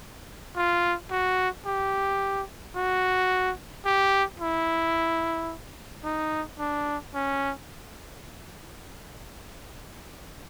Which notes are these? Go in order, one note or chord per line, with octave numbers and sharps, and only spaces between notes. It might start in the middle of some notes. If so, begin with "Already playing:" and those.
F4
F#4
G4
F#4
G4
E4
D#4
D4
C#4